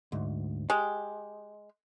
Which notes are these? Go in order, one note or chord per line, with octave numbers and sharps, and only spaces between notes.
D2 G#2
G#3 G4